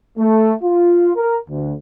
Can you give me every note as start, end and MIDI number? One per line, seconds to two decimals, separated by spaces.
0.18 0.53 57
0.62 1.11 65
1.17 1.36 70
1.49 1.73 38